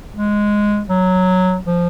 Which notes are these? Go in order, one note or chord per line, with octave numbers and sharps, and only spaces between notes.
G#3
F#3
F3